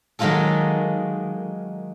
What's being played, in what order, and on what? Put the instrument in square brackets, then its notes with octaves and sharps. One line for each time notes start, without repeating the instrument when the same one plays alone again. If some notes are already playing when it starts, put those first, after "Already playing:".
[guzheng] D#3 F#3 G#3 A#3 F4 A4